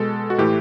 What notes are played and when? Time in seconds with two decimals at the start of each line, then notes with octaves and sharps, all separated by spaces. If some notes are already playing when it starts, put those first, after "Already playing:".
Already playing: B2 G#3 A4
0.30 F#4
0.38 A2 E3 A3 G4